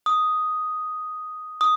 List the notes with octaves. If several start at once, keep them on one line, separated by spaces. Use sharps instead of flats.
D#6
D#6